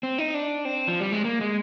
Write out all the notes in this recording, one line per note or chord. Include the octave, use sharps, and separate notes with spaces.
C4
D#4
D4
C4
F3
G3
G#3
A#3
G#3